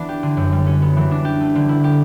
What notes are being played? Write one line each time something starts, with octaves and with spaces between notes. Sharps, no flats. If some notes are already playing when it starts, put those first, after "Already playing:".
Already playing: E3 B3 D4
G4
D3
F#2
G3
C#4
B3
E3
D4
G4
A3
D3
E4
G4